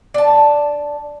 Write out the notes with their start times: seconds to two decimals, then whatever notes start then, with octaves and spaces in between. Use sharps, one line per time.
0.14 D4 A5